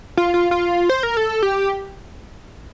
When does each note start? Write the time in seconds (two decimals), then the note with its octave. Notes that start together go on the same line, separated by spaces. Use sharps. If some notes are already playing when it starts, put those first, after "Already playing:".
0.17 F4
0.34 F4
0.51 F4
0.90 C5
1.03 A#4
1.17 A4
1.43 G4